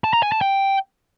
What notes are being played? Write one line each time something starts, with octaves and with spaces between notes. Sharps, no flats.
A5
A#5
G#5
A5
G5